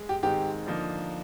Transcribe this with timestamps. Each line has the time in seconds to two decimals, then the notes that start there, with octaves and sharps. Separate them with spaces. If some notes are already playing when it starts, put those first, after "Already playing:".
Already playing: G#3
0.09 G4
0.23 G#2 D#3 G#3 C4 G4
0.66 D3 F3 A#3 D#4